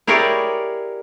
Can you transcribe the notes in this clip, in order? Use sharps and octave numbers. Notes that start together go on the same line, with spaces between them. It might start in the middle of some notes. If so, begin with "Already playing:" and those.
E4 G4 G#4 A#4 C#5 D5